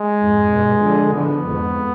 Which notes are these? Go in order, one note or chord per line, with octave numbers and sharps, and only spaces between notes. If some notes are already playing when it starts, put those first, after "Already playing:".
Already playing: G#3
F2 G#2
G2 B2
D3 F3
D3 F3 B3
F2 G#2